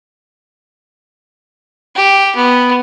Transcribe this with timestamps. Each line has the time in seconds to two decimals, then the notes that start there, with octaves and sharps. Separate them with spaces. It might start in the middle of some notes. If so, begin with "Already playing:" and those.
1.96 G4
2.36 B3